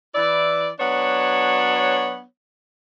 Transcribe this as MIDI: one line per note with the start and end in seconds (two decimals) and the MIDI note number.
0.15 0.70 52
0.15 0.70 64
0.15 0.70 74
0.80 2.23 54
0.80 2.23 59
0.80 2.23 62
0.80 2.23 73